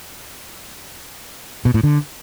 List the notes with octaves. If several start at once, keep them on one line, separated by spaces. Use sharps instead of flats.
B2
A2
D3